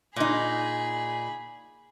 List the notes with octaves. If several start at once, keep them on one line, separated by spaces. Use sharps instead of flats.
A#2 D#4 G#4 B5